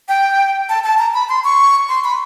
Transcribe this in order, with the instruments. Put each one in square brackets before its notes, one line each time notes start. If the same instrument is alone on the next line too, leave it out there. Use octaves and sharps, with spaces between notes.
[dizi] G5
A5
A5
A#5
B5
C6
C#6
C6
B5